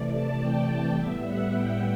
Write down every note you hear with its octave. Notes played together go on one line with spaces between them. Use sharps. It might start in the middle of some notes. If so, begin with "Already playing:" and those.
Already playing: C3 E3 A3 D5
A5
G5
A2 G3 B3 E5
F#5
G5